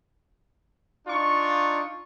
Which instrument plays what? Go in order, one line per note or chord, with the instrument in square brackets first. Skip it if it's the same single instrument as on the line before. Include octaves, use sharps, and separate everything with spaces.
[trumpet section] D4 D#4 F4 C#6